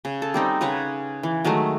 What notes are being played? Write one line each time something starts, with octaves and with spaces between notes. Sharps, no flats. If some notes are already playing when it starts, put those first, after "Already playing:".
C#3
A4
G3 C4 D#4
C#3 B4 C#5 F#5
E3
D#3 F#3 G#3 A3